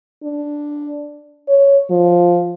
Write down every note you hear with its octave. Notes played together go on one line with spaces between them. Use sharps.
D4
C#5
F3